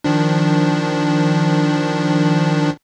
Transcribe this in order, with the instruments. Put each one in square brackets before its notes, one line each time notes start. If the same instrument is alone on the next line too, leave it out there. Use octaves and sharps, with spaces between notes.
[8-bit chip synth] D#3 F3 D4